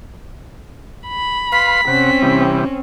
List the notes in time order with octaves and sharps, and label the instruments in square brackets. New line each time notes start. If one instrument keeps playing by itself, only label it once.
[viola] B5
[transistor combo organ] B4 F5 C6 [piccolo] B6
[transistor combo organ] C3 F#5 [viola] C4 C#4
[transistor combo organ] C3 E3 G3